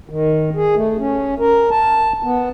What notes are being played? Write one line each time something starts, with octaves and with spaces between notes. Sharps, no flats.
D#3
G#4
A3
C#4
A#4
A5
B3